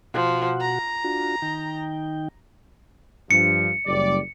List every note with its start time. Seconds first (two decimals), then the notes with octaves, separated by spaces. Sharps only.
0.14 B2 F3 F#4 F#5
0.61 A#5
1.04 D4 F4 F#4
1.42 D#3 D#4 G5
3.31 G2 F3 C#7
3.87 F#1 G3 D5